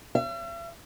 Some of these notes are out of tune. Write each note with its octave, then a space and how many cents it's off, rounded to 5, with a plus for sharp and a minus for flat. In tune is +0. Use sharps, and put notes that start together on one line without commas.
E5 +45